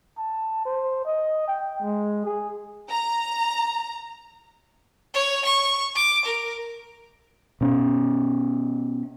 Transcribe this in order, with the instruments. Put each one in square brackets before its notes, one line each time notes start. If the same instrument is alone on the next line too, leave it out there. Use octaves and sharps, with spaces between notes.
[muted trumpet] A5
C5
D#5
G5
G#3
G#4
[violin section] A#5
[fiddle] C#5
C#6
D6
A#4
[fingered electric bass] B2 C#4